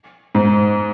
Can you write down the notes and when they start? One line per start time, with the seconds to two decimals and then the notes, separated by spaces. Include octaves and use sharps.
0.35 G#2